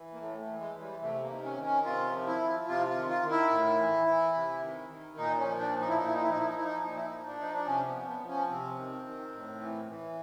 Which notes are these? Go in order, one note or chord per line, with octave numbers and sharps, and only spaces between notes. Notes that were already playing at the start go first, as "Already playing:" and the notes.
Already playing: E3
A#3
A2 A3
A3
E3
G#3
E3
G3
C3 A3
A#3
D#3
C#4
D#3
C#4
C3 F4
F3
E4
F3
C3 F4
F4
D#3
F4
D#3
E4
A2
E3
E3
C3
D#3
D#3
A#2 D#4
C#4
F3
D4
F3
D#4
E4
D#4
A#2 E4
D#4
E4
F3 D#4
E4
D#4
F3 E4
D#4
A#2 D#4
E4
D#4
F3
D4
F3 D#4
D4
C3 C#4
B3
F3
B3
F3
C#4
C3 C4
D#3
D#3
A2
E3
E3